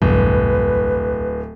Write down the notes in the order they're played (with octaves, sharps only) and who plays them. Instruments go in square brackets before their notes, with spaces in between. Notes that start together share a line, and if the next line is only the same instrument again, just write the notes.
[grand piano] D1 [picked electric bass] B1 E2 G2 [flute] B4